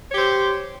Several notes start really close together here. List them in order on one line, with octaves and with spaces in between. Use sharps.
C#5 G4 C5